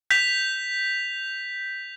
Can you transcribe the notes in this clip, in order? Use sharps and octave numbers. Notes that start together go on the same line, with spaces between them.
G6 B6 F7